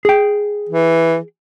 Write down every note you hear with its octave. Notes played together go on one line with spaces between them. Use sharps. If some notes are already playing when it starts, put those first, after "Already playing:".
G#4 G5
E3